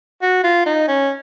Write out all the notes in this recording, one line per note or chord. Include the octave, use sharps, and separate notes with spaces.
F#4
F4
D#4
C#4